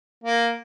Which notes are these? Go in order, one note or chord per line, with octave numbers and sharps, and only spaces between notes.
A#3